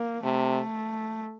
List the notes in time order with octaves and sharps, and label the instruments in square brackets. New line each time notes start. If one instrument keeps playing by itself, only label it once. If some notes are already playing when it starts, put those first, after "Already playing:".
Already playing: [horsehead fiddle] A#3
[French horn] C3 [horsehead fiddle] A3